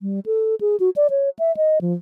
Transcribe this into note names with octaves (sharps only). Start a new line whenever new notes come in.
G3
A4
G#4
F#4
D5
C#5
E5
D#5
F3